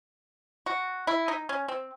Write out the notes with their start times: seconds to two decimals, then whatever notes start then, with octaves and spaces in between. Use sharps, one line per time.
0.66 F#4
1.07 E4
1.28 D#4
1.49 C#4
1.68 C4